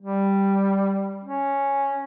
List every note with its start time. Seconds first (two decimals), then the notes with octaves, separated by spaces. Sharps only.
0.01 G3
1.24 C#4